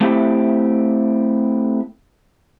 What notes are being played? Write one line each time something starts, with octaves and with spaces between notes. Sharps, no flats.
A3 C4 E4 G4